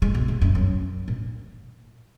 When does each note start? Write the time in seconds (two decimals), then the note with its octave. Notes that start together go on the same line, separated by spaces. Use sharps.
0.02 G#3
0.15 B2
0.28 A#2
0.42 F#2
0.55 F#2
1.08 A#2